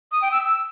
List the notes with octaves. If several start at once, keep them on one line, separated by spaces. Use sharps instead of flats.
D#6
G5
E6